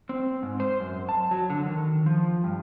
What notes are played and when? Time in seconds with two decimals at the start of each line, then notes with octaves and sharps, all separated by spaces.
0.09 C4
0.43 G#2
0.60 C5
0.80 F#2
1.09 A5
1.31 F#3
1.50 D3
1.66 D#3
2.06 F3
2.44 G2